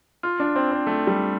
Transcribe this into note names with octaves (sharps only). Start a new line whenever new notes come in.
F4
D4
C4
C4
A3
G3